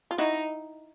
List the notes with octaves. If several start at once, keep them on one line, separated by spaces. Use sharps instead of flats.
F4
D#4 E4 F#4